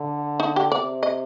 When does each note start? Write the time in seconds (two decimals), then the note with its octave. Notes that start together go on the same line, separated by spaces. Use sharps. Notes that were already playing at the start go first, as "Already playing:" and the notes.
Already playing: D3
0.40 D#4
0.56 G4
0.72 C3 D5
1.03 D#5